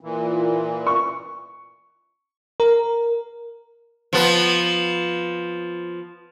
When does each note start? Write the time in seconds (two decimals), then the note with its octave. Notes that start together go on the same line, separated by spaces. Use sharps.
0.01 A#2 E3
0.87 C#6
2.60 A#4
4.13 F3 B3